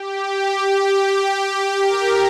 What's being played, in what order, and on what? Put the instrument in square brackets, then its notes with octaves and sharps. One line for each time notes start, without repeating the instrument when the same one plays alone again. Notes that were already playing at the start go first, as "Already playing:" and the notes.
Already playing: [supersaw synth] G4
G4
A#4